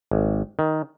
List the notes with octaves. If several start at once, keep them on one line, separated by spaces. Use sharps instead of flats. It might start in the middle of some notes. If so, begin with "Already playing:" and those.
G#1
D#3